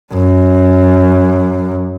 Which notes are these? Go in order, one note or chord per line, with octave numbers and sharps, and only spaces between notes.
F#2